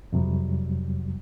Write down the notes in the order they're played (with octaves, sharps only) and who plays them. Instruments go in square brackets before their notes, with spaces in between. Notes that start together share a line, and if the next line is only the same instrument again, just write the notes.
[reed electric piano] F2 C3 F#3 G3